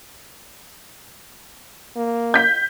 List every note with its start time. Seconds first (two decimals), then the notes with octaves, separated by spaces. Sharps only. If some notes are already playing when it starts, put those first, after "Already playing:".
1.96 A#3
2.34 G6 B6